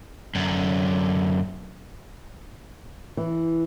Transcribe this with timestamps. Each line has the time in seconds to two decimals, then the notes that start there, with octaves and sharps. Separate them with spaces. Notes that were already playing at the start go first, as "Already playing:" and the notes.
0.35 F#2 D3
3.17 E3